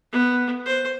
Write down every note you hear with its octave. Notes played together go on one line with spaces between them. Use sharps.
B3
C5